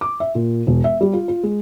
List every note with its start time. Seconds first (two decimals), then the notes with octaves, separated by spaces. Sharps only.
0.01 D6
0.20 E5
0.35 A#2
0.67 E1
0.84 E5
1.01 G3
1.13 F4
1.28 F4
1.43 G#3